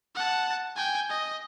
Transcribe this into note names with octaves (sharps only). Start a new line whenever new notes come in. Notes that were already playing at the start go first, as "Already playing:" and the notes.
F#5 A5
G5 G#5
D#5